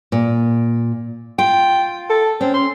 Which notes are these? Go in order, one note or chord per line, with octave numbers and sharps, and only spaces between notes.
A#2
F4 G5
A4
C4 C#4
C6